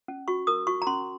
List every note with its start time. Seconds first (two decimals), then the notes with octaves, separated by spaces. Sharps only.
0.08 C#4
0.28 F#4 C#6
0.47 A#4 D#6
0.67 F#4 C#6
0.82 A#5
0.87 C#4 C6